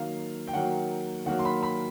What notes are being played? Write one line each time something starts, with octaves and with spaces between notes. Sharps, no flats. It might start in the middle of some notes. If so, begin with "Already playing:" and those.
Already playing: D#3 F#3 A#3 F5
G5
D#3 F#3 A#3 F#5
D#3 F#3 A#3 F#5
C6
B5
B5